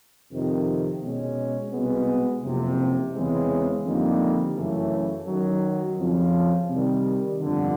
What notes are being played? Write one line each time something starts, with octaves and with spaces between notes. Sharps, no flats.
F2 C3 D#3
B2 G#3 C#4
C2 B2 G#3 B3
F#1 F2 C3
E2 C#3 E3 G#3 C4
F2 D3 G3 A#3 D#4
F#2 C#3 E3 A3 C#4
F#2 D#3 F#3
F2 C#3 F3
C3 D#3 G3
G1 F2 D3